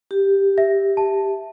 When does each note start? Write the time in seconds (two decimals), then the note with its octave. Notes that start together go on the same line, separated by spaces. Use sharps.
0.11 G4
0.58 E5
0.97 A5